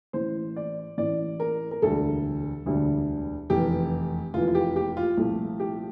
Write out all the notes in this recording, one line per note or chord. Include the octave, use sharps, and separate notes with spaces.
A1 A2 E3 C5
D5
A1 A2 E3 D5
A#4
A#4
E1 D2 D3 G3 D4 A4
E1 D2 D3 G3 D4
F1 E2 E3 G4
F1 E2 E3 F4
F4
G4
G4
F4
C2 A#2 F3 A3 E4
G4